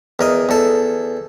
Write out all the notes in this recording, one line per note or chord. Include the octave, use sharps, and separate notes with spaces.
E2 A#4 D#5
E2 A4